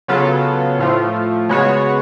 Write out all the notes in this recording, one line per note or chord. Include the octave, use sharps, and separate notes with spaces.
C#3 F#3 B3 F4 A4
A2 F3 A3 F4
C#3 G#3 B3 F#4 C#5